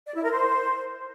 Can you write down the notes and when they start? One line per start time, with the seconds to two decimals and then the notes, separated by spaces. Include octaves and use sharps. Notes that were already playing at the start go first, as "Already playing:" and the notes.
0.07 D5
0.15 E4
0.23 A#4
0.32 C5